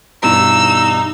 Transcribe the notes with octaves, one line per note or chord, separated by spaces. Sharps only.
G2 B2 E3 D#4 E6